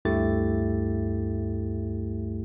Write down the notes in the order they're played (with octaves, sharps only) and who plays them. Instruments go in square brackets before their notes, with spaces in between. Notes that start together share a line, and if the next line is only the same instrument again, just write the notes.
[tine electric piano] D2 G2 A3 E4 G4 A6